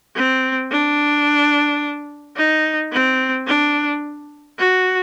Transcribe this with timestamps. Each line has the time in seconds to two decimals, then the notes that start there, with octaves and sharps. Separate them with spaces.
0.16 C4
0.72 D4
2.37 D#4
2.93 C4
3.47 D4
4.59 F#4